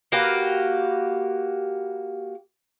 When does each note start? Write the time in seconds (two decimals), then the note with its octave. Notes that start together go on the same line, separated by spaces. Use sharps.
0.12 A#3 F#4 G4 B4